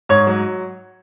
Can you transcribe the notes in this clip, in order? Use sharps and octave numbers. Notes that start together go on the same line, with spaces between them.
G#2 C#5
F#3